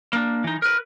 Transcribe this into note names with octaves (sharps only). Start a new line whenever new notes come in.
A#3 D4
E3 D#4
A#4 B4